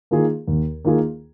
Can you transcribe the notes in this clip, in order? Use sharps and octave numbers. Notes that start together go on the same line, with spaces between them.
D#3 A#3 F4 G#4
D#2
D#3 A#3 F4 G#4